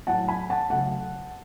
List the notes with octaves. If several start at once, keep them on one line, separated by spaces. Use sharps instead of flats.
A2 F#3 A3 F#5 A5
G#5 B5
F#5 A5
C#3 F#3 A3 F#5 A5